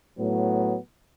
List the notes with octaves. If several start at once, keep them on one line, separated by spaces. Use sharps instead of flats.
A2 F#3 B3